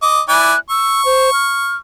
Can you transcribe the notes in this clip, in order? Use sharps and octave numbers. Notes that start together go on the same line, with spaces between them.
D#5 D6
E4 D5 G#5 F#6
C#6 E6
C5
F6